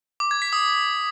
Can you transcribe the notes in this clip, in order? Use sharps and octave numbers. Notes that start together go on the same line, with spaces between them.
D6
G#6
B6
D#6